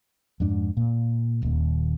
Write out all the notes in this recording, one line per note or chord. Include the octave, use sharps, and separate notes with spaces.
F2 G#2 D4
A#2
D#1 D#2